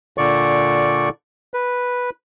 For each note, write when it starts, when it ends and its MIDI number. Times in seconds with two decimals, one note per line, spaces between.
0.18 1.09 46
0.18 1.09 50
0.18 1.09 74
0.18 1.09 85
1.54 2.10 71